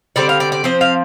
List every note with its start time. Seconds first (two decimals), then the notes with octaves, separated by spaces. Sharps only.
0.16 D3 G3 C4 D5
0.29 F5
0.40 D5
0.52 D5
0.64 F3 C4 C5
0.81 F5